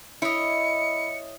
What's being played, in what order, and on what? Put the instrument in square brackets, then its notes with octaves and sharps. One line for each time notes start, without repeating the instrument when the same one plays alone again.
[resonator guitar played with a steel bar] E4 [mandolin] C#5 D#5 [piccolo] C#7